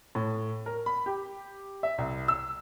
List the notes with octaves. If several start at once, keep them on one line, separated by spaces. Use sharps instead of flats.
A2
A#4
B5
G4
E5
C2
E6